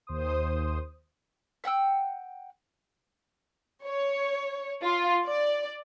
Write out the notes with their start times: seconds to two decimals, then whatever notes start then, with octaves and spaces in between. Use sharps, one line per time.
0.07 D#2 C5 D#6
1.64 E5 F#5 G5 E6
3.85 C#5
4.83 F4
5.25 D5